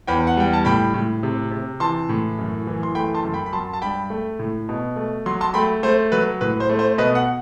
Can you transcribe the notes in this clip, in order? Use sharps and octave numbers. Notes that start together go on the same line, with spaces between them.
E2 G5 B5
F#5
G3 G5
A5
A2 G5 B5
A2
C3
C3
E3 A5 C6
A2
F#2
E3
C6
A3 G5 B5
A5 C6
F#2
G5 B5
B5
F#3 A5 C6
A5
G2 G5 B5
A3
A2
B2
A3
F#3 C6
A5 C6
A3 G5 B5
A3 C5
F#3 B4
A2 B4
C5
A3
C5
B2 B4 D#5
F#5